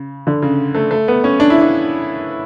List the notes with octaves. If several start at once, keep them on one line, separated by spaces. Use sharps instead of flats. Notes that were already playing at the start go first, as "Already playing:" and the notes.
Already playing: C#3
D3
C#3
A3
A3
B3
C#4
D4
E4
D4